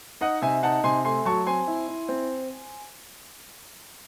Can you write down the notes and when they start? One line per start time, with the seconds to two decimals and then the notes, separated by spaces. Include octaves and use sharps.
0.21 D#4 D#5 F#5
0.42 C3 E5 G#5
0.63 D#4 F#5 A5
0.84 C3 G#5 C6
1.05 A3 G#5 C6
1.25 F#3 A5 C#6
1.46 C4 G#5 C6
1.68 E4
1.88 E4
2.09 C4